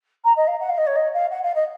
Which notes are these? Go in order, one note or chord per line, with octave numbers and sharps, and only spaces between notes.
A#5
D#5
F5
F#5
F5
D#5
C#5
D#5
F5
F#5
F5
D#5